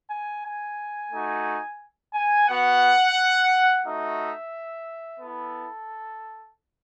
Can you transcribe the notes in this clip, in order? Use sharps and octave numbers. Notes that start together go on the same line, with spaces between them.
G#5
G#5
A3 D#4 F#4
G#5
B3 F#4 F#5
A3 D#4 F#4 E5
B3 E4 A4